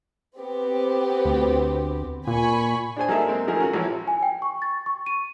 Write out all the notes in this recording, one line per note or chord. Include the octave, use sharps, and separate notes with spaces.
B3 C4 G4
D2
A#2 G#5 B5 C#6
D4 G#4 C5 G#5
F#3 A#3 D#4 G#4 A4 E5
G#3 A#3 C4
D#3 F3 F#3 A3 G#4 A#4
C#4 F#4
A1 E3 F3 E4 C#5
G#5
G5
C#6
A6
C#6
D#7